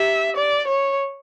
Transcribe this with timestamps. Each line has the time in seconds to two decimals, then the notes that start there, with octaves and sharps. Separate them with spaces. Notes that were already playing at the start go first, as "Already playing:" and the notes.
Already playing: G4 E5
0.36 D5
0.67 C#5